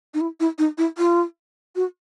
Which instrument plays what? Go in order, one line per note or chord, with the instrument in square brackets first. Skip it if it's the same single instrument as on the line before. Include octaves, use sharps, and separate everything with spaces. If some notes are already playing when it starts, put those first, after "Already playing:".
[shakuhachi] D#4
E4
E4
D#4
E4
F4
F#4